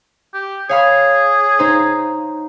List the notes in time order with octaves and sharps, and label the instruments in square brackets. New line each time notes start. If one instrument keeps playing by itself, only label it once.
[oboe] G4
[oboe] G#4 [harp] C#5 F5 B5
[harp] D#4 C5